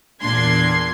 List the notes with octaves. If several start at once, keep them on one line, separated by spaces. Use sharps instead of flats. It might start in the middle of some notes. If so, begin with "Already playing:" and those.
E2 A#2 D4 C6 G#6